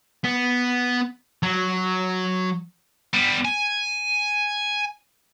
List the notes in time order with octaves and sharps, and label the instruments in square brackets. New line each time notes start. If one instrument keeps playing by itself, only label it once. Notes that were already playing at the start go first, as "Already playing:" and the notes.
[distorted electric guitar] B3
F#3
G3 B3
G#5